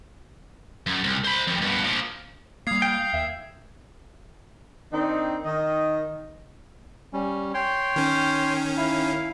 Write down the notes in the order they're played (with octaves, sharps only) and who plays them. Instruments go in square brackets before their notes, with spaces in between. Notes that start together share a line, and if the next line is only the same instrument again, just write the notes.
[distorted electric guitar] F#2
C2
C5 B5
F2 D#3
G2 B2
A#2 F3
[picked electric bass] G3 A#3 [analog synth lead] F5 [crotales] D#6 G#6 C7
[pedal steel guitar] G5
[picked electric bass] D#2 [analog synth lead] E5
[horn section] D#3 C4 D4 D#4
D#3 D#5
[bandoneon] G3 C#4
C#5 G5 C6
[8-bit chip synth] D#3 C#4
[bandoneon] E4 F5